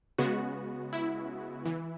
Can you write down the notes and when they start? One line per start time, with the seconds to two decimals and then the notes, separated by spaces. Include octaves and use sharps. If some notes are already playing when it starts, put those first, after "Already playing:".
0.19 C#3 G#3 B3 F#4
0.93 E4
1.66 E3